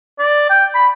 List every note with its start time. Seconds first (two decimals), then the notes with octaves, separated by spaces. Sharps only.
0.19 D5
0.50 G5
0.75 B5